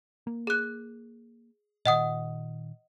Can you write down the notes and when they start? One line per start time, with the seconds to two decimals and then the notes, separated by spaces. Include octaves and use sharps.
0.27 A#3
0.47 G#4 F#6
1.86 A#2 D#3 D#5 F#5 D#6